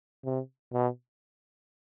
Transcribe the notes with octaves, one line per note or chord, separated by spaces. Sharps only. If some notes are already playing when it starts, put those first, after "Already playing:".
C3
B2